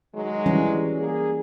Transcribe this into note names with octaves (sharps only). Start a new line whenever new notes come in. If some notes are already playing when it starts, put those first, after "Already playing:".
D#3 F#3 G#3
E3 G3 C#4
A#3 G#4